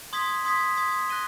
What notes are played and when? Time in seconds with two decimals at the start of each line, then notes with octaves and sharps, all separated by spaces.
0.13 C6 D#6 G#6 B6
0.45 C6 D#6 G#6 B6
0.77 C6 D#6 G#6 B6
1.09 F#6 A#6 D#7 G7